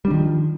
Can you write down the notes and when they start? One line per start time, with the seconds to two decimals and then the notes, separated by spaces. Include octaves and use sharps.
0.05 G3
0.08 D4
0.11 D#3
0.13 F3